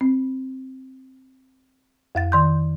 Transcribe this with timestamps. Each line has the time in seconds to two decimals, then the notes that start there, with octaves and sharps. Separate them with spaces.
0.01 C4
2.15 F2 F5 A6
2.32 D#3 C6 G6